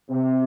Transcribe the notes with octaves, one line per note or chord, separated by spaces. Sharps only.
C3